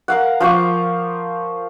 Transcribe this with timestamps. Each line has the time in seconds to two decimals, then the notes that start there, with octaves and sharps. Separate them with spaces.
0.08 A#4 F5 F#5
0.41 F3 C5 C#6 D6